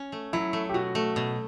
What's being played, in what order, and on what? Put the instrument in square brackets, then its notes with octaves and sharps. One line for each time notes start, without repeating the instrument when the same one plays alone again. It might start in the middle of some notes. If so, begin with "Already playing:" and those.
Already playing: [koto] C#4
A3
[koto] F#3 [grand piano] E4
[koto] A3
[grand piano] G4
[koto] B2 [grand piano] F#4
[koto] A3
B2